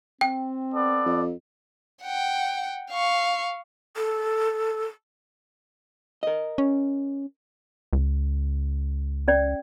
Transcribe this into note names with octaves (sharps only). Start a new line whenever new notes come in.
C4 G5
B3 A4 D5
F2
F#5 G5
F5 C#6
A4
A#4 D#5
C#4
C#2
C#4 D5 G5